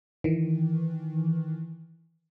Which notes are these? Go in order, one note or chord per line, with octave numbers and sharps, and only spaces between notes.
D#3 E3